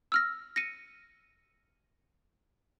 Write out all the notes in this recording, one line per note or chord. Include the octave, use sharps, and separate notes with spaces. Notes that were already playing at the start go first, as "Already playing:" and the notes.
E6 F6 A#6
A#6 C#7 D#7